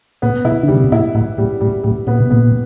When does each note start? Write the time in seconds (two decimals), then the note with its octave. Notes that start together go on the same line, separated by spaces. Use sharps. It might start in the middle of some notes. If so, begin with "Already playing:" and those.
0.22 A#2 B3
0.45 B2 E4
0.63 D3
0.68 C#3 G3
0.77 C3
0.84 B2
0.92 A#2 E4
1.15 A2 E4
1.38 A2 G3
1.61 A2 G3
1.84 A2 G3
2.07 A#2 B3
2.20 B2
2.30 A#2 B3